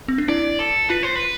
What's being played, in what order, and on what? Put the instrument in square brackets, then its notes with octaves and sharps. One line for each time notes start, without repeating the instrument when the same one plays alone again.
[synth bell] C4
D4
[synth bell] E4 [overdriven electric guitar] D5
[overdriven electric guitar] A4
[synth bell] F4 [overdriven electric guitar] B4
[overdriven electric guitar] C5
B4